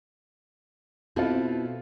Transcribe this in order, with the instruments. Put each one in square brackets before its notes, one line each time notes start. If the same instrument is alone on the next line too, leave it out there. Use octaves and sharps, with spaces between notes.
[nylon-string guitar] B2 E4 A4 [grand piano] C4 F4